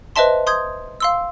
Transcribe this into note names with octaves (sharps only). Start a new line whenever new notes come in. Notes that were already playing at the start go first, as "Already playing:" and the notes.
B4 C5 D#5 E5 A5 C6
C6 D#6 G6 G#6
F5 C6 E6